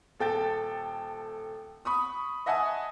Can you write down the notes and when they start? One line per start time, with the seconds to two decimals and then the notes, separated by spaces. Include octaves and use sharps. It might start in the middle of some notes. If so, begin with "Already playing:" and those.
0.20 D#1 A4 G5 A6
1.85 B5 C#6 D#6
2.46 D#5 E5 F#5 G#5 A5 D#6